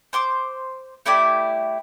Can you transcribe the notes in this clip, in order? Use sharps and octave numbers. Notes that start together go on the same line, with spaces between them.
C5 C6 D6
A3 E4 G4 D5